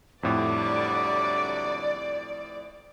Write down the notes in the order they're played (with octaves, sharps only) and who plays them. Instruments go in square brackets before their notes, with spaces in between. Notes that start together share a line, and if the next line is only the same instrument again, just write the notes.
[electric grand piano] F2 A2 [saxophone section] D3 F#3 G3 [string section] D5 [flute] D6